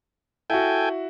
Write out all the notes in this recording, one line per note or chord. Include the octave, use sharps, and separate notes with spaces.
E4 F#4 A4 G5 G#5